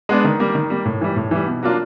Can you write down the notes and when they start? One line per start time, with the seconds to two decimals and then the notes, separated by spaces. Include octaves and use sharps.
0.09 G#3 B3 D4
0.25 D#3
0.40 G3 A#3
0.55 D#3
0.70 G3 A#3
0.85 A2
1.01 E3 G3
1.16 A2
1.31 E3 G3
1.47 B2
1.63 F#3 A#3 D4 F4